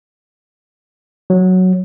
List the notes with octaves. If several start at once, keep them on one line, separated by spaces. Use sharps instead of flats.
F#3